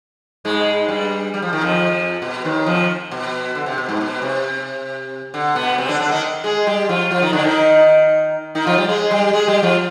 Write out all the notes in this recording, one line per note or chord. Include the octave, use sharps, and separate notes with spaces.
G#2 G#3
G2 G3
G3
F3
D#3
F2 F3
B2
D#2 D#3
F2 F3
B2
D3
C3
B2
G#2
B2
C3
D3
B2 B3
C3 C4
D3 D4
D3 D4
D#3 D#4
G#3 G#4
G3 G4
F3 F4
F3 F4
D#3 D#4
D3 D4
D#3 D#4
D#3 D#4
F3 F4
G3 G4
G#3 G#4
G3 G4
G#3 G#4
G3 G4
F3 F4